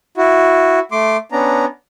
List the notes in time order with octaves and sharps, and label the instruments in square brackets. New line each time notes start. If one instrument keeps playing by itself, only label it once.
[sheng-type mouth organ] E4 F#4
A3 C6 D6
B3 C#4 D4 A#5